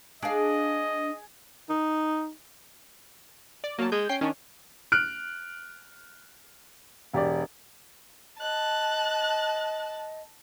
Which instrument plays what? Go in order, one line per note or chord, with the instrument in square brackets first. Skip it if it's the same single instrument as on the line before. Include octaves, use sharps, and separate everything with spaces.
[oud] D4 F5 [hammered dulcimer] G#4 [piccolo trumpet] D#5
[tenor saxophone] D#4
[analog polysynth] D5
[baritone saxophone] F#3 [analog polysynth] A#3 A5
[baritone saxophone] G#3 [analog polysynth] G6
[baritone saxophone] C#4 [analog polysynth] G5 G6 C7
[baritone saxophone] D#3 [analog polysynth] C#4 D4
[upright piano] F6 F#6 D7
E1 G4 D5
[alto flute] D#5 [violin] A5 [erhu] F#6